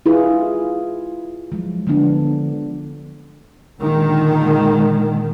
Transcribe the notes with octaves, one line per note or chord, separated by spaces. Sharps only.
E4 F4 G#4 B4
F3 F#3 G#3
D3 F3 B3 D4
A#2 D3 D#3 G#3